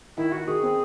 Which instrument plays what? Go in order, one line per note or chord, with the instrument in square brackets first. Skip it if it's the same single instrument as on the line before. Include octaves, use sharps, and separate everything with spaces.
[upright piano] D#3 [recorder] E4
[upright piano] D#3 [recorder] F#4
[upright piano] D#3 [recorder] G#4
[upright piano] C4